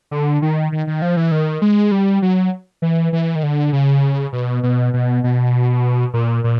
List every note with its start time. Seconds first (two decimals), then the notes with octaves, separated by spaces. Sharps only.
0.11 D3
0.42 D#3
0.72 D#3
0.87 D#3
1.02 F3
1.17 E3
1.32 D#3
1.62 G#3
1.92 G3
2.22 F#3
2.82 E3
3.13 E3
3.35 D#3
3.43 D3
3.73 C#3
4.33 B2
4.63 B2
4.94 B2
5.24 B2
6.14 A#2
6.44 A#2